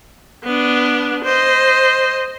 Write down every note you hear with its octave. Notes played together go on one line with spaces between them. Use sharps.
B3 D4
C5 D#5